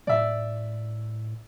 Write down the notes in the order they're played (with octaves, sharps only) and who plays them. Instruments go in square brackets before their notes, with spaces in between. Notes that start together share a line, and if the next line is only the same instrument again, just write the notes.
[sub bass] A2 [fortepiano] D5 E5